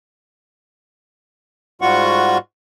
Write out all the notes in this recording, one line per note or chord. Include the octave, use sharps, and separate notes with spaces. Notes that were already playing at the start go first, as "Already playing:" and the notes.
G#2 G3 F4 F#4 F#5 C#6